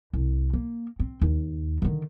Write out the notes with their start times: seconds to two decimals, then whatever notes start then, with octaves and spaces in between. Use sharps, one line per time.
0.13 C2
0.53 A#3
0.99 C4
1.21 D#2
1.82 D3 D#3